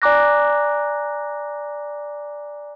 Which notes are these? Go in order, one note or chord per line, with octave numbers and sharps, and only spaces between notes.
D5 G#5 A#5 D6 F#6 A#6